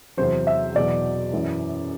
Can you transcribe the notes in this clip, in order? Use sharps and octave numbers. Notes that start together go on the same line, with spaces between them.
E2 C3 F#3 C5
E5
E2 B2 F#3 D5
F#2 E3